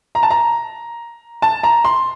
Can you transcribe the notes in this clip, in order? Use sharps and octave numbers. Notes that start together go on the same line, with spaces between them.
A#5
A5
A#5
A5
A#5
C6